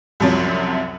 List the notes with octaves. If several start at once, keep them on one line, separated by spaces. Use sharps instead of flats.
C2 F#2 C3 F3 F#3